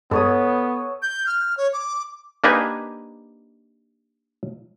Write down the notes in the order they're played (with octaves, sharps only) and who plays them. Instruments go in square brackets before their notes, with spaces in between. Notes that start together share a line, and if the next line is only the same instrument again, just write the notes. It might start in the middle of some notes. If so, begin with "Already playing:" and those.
[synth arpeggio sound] G2 G#3 [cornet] B3 [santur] A4 C#5 D#6
[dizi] G6
F6
C#5
D6
[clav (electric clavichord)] A#3 D4 D#4 G4 B4 G#5